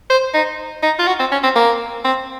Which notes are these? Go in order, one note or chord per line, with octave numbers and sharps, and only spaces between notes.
C5
D#4
D#4
F4
F#4
C4
C#4
C4
A#3
C4